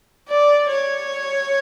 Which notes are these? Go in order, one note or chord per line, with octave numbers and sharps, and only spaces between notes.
D5
C#5